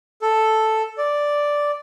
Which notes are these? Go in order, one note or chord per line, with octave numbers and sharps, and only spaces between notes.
A4
D5